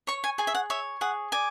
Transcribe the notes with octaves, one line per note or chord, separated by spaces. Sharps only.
C#5 C#6
G#5
G#4 G#5
E5
F#5
C#5 E5
G#4 F#5
D5 G#5